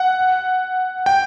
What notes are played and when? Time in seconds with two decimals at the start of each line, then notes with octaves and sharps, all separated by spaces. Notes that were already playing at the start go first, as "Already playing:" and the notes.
Already playing: F#5
1.06 G5